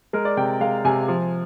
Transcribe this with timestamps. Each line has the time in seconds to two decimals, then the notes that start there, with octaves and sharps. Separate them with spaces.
0.13 G#3 A#4
0.25 D5
0.37 C3 G5
0.60 G#3 F5
0.85 C3 G#5
1.08 F3